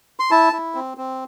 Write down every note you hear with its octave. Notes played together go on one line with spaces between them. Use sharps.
C6
E4 A5
E4
C4
C4